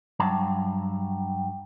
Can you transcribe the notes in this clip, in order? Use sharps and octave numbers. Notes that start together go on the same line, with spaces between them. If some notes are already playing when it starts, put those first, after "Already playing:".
G2 F#3 A5